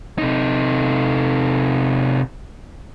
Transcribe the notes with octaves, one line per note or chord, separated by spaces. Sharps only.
C3 D#4